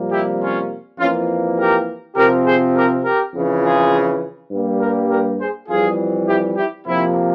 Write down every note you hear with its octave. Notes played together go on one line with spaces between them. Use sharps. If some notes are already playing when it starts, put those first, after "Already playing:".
Already playing: F2 C3 G3 A#3
E4 G4
C#4 F4
F2 E3 A#3 C#4 F4
G4 A#4
C3 F3 C4 G4 A#4
G#4 C5
G4 A#4
G4 A#4
F2 C#3 E3
F4 G#4
G2 G3 A#3
G4 A#4
G4 A#4
G#4 C5
F2 E3 G3 F4 G#4
E4 G4
E4 G4
F2 C3 F3 A#3 C4 E4